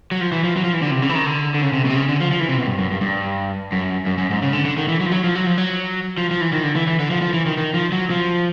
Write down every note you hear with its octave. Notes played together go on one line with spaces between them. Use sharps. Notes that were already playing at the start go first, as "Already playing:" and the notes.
F#3
F3
E3
F3
F#3
F3
E3
D3
C3
C#3
E3
D#3
D3
D3
C#3
C3
B2
C3
C#3
D3
F3
F3
E3
C3
B2
G2
F#2
G2
G2
F#2
F#2
F#2
G#2
C#3
D3
D3
D#3
E3
F#3
F3
F#3
F3
F#3
F3
F#3
F3
F3
E3
D#3
D3
E3
E3
D3
F3
F3
E3
D#3
D#3
F3
F#3
F3